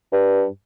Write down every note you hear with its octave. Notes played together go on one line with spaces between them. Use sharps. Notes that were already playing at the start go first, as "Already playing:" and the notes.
G2